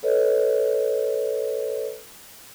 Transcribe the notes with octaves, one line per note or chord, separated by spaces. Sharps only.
A4 B4 C#5 D#5